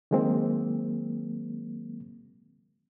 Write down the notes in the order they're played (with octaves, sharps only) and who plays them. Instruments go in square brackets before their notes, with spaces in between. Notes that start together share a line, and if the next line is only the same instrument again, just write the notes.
[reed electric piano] D#3 F#3 G#3 A#3 C4